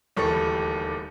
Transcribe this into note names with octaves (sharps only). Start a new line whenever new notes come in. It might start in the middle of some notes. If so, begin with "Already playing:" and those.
D1 D#2 E3 G3 A4 C#6